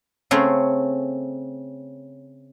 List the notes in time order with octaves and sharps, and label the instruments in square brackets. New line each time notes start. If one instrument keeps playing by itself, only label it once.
[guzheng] C#3 A3 C4 C#5